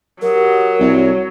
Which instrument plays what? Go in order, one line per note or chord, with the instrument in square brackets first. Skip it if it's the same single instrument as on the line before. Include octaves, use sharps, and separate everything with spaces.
[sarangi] F#3 [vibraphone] G4 F#5 D#6 [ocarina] A#4
[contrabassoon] C2 [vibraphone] F#4 C#5